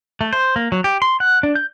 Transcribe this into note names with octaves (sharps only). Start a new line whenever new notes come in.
A3
C5
A#3
F#3
G4
C6
F#5
D4
G6